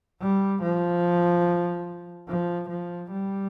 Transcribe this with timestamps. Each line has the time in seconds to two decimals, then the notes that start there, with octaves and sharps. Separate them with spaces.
0.21 G3
0.62 F3
2.28 F3
2.69 F3
3.10 G3